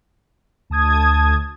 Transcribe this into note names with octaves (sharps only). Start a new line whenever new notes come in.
D2 A5 D#6 G#6